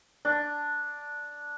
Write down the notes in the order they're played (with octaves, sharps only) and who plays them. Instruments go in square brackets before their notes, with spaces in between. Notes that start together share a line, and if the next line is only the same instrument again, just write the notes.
[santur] D4